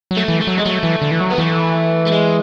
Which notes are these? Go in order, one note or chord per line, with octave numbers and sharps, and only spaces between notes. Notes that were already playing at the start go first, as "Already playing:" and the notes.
F#3
A3
E3
A3
F#3
G#3
F#3 A3
E3
D3
E3
F#3
B3
E3 A3
A3
G#3